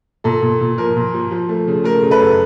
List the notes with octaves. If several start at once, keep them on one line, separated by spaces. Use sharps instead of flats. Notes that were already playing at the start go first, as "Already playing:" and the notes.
A#2 A4
A#2
A#2
F3 A#4
A#2
F3
F3
A3
C#3
A3 A#4
C#3
A4 B4
F#2